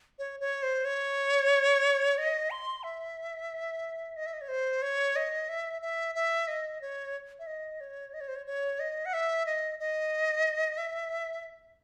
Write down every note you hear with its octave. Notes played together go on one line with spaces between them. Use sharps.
C#5
C#5
C5
C#5
D#5
C6
E5
D#5
E5
D#5
C#5
C5
C#5
D#5
E5
E5
E5
D#5
C#5
E5
D#5
C#5
D#5
C#5
C5
C#5
C#5
D#5
F#5
E5
D#5
D#5
E5